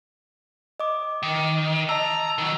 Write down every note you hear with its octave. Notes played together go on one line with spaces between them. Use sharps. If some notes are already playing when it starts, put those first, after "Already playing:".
D#5 D6
D#3
D#5 A5 A#5 E6
D#3 F#3